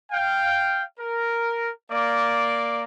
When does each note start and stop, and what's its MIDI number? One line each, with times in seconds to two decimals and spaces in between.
0.12 0.82 77
0.12 0.82 79
0.99 1.71 70
1.91 2.83 58
1.91 2.83 74